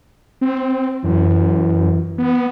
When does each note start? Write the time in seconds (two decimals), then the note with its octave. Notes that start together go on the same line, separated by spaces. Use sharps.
0.41 C4
1.04 F#2 E3
2.18 B3